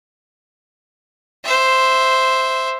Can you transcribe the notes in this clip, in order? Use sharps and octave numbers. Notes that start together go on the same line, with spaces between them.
C5 E5